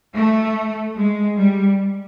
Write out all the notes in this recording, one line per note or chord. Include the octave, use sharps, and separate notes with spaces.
A3
G#3
G3